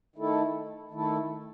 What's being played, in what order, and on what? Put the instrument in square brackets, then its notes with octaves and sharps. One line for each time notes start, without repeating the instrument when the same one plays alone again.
[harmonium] D#3 A3 E4 A4
D#3 A3 E4 A4